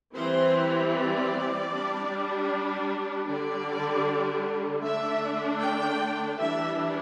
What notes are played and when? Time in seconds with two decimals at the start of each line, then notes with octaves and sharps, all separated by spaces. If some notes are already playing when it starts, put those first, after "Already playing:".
0.15 E3 G3 C4 C5
0.93 D5
1.71 G3 D4
3.27 D3 G3 D4 D5
4.83 D3 A3 D4 E5
5.61 G5
6.40 E3 G3 D4 E5